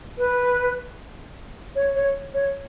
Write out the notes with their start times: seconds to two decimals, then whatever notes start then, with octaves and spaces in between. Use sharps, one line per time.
0.18 B4
1.75 C#5
1.95 C#5
2.33 C#5